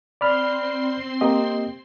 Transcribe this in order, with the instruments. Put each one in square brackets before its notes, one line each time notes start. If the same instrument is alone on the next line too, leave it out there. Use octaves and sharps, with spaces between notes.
[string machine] C4 C6 C7 [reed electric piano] D5 B5 F6
[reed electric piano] A#3 G4 D#5